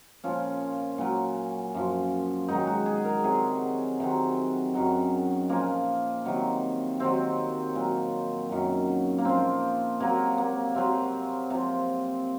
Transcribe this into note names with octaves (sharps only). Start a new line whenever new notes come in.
A#2 F3 C#4
A#2 F#3
F#2 F3
G#2 D#3 F#3 D#4
F#4
G#4
A#4
C3 F#3 G#4
C3 D#3 F#3
F#2 D#3 F#3
A#2 F3 A#3
C3 D#3 F#3
C3 D#3 F#3 C4
A#2 F#3
F#2 D#3 F#3
A#3
A#2 F3 C4
C3 F#3 A#3
A#3
C3 F#3 C4
C3 F3